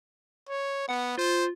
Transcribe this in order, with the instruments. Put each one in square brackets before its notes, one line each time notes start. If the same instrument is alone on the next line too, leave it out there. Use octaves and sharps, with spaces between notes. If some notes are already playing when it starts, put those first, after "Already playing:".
[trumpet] C#5
[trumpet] B3 [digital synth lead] F#5
[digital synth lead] F4 [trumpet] C5